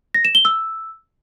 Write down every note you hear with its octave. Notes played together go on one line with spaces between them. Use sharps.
A#6
E7
G7
E6